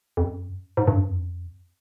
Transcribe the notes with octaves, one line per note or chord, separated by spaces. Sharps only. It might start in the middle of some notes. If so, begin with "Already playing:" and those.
F2
F#2
G#2
G2
F#2
F2